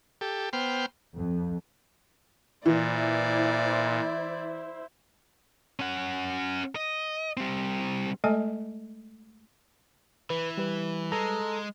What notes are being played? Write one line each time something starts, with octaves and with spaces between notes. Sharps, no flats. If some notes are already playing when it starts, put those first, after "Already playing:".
G4 A4
B3 C5 G5 F6
F2
A#2 E3 E4 C5 D5
C#4 F#5
D#5
G3 C4
G#3 A3 A4 D#5 G#5 A5
E3 B4
G3 B4
G#3 A4 A#5